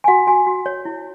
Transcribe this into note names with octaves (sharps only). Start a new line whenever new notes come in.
G#5
F#4 F#5
F#4 G#5
F#4
C#5
E4